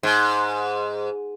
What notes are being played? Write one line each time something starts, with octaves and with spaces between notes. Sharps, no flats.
G#2